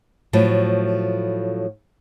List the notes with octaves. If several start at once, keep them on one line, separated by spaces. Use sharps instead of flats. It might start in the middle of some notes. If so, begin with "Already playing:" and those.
A2 F3 F#3 A3